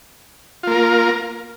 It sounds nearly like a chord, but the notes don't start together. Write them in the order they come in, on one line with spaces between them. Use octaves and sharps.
F4 A#3 A#4